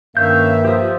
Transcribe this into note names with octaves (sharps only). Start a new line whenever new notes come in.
G2 D#3 A#3 C#4 C#5 E5 F5 G6
F3 G4 D#6